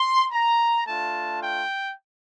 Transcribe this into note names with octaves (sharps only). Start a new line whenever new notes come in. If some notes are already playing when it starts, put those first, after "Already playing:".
Already playing: C6
A#5
A3 D4 F4 A5
G5